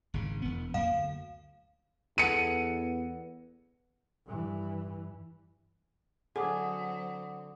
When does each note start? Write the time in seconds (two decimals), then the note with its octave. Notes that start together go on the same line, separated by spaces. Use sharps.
0.14 G#1 C#3
0.42 E1 B3
0.74 F#2 A#3 F5
0.88 D2
2.18 E2 B3 A4 C#7 D#7
4.26 G2 E3
6.36 D3 F#3 C4 G#4 F#5 D6 D#6